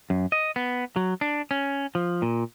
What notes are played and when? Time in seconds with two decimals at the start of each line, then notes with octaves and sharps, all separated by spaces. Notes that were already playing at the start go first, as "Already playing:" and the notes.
0.10 F#2
0.32 D#5
0.56 B3
0.96 F#3
1.21 D4
1.51 C#4
1.95 F3
2.22 A#2